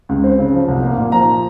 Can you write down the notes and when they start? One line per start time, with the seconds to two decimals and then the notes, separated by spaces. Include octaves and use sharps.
0.09 C#2
0.24 C4
0.39 C#3
0.54 F3
0.68 C2
0.83 A#3
0.97 A#2
1.12 F3 A#5